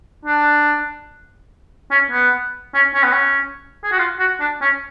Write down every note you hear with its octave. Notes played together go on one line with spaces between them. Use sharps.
D4
C#4
B3
C#4
C#4
B3
C#4
G#4
F#4
F4
F#4
D4
C#4